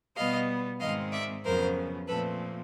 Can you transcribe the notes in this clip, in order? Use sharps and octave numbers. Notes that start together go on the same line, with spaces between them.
B2 G3 B3 D#5 F5
G#2 D#3 G#3 C4 D#5 F5
D5 E5
F2 C#3 F#3 B3 A#4 C5
A#2 F3 A3 C4 A4 B4